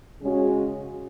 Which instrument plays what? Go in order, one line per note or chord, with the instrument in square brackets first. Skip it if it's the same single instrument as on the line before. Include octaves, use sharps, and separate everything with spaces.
[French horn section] C#3 G#3 C#4 F#4